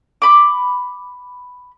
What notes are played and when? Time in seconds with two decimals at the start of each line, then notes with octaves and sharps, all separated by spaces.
0.22 B5 D6